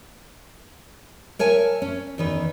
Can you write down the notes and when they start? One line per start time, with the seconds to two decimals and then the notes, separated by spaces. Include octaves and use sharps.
1.39 A#4 C#5 E5 G#5 A5
1.82 C#4
2.18 E2 D#3 B4